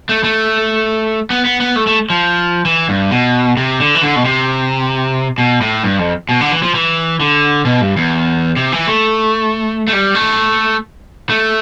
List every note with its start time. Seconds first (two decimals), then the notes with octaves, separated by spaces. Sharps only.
0.09 A3
0.24 A3
1.30 B3
1.45 B3
1.60 B3
1.76 A3
1.87 A3
2.10 F3
2.65 E3
2.89 G2
3.11 B2
3.57 C3
3.80 D3
3.95 E3
4.02 D3
4.16 B2
4.25 C3
5.38 B2
5.61 A2
5.83 G2
5.99 F2
6.29 B2
6.41 D3
6.51 E3
6.63 F3
6.75 E3
7.20 D3
7.65 B2
7.81 G2
7.96 E2
8.56 C3
8.72 E3
8.87 A3
9.88 A3
9.93 G3
10.15 A3
11.30 A3